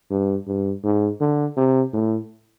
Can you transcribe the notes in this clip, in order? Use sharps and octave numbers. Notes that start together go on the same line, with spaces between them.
G2
G2
G#2
D3
C3
A2